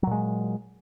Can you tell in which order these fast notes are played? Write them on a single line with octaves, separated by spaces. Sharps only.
F#3 A#2 G#3